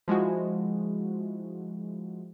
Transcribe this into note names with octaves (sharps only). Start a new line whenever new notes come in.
F3 G#3 E4 F#4